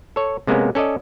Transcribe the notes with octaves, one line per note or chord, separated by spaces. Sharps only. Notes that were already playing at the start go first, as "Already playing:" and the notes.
A4 C#5
C3 G#3 A#3 B3 C#4
C#4 A4 D5 D#5